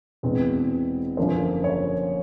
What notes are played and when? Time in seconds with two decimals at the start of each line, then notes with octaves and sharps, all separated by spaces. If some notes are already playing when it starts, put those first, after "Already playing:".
0.23 E1 E2 B2 G#3 C4 B4
1.17 F#1 F#2 D3 F3 A#3 C5
1.64 C#5